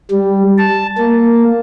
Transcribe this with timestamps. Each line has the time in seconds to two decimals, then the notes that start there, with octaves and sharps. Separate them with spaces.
0.11 G3
0.58 A5
0.98 A#3